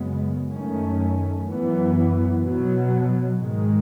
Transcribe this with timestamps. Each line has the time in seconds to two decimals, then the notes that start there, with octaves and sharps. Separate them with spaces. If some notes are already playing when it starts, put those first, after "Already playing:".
Already playing: F#2 C#3 G#3 B3
0.52 F#2 D#3 A3 C#4
1.47 F#2 E3 B3
2.42 B2 F#3 B3
3.37 G#2 D#3 G#3